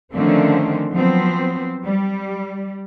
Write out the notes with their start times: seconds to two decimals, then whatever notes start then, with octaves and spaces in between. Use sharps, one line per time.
0.14 D3 D#3 F3 A3 C4 C#4
0.91 F3 F#3 B3 C4
1.84 G3